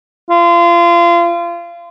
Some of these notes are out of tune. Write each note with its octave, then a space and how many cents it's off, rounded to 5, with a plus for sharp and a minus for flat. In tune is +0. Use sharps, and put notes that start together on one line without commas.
F4 -30